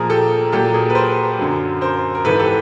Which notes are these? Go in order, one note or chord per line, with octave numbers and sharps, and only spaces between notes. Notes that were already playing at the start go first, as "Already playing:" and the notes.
Already playing: A#2 F3 G#4 A#4
G4 A4
A#2 F#3 G4 A4
G#4 A#4
B4
A#4 C5
F#2 D3 F#3
A#4 C5
A#4
G#2 E3 A4 B4
G4 A4